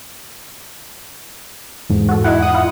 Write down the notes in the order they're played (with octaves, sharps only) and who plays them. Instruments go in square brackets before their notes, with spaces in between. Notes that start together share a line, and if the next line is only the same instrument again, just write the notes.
[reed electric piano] E2 G#2
[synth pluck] F#4 A4
[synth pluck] D#4 F#5 [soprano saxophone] E4
[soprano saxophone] F#5 [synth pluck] D#6
[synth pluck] E4 F4